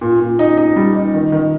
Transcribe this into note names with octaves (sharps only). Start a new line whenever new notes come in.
A#2
A#2
D#4
D#4
G3
D#4
D#3
D#3